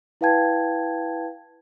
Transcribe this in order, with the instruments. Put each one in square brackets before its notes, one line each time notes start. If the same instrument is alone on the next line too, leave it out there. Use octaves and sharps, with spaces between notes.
[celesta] E4 B4 F5 G5 A5 G#6